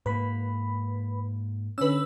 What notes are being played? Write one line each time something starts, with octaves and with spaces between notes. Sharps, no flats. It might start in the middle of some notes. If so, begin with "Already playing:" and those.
G#2 A#3 B4 B5
D3 C#4 B4 E6